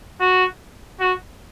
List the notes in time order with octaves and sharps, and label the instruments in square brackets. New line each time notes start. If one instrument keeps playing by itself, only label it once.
[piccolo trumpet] F#4
F#4